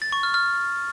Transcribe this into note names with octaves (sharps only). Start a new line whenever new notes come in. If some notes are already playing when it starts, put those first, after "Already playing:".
A6
C#6
F6
F6